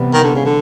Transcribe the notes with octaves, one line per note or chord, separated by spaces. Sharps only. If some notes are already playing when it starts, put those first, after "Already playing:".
Already playing: C3 E3 G3 B3
D#3
D3
C#3
D3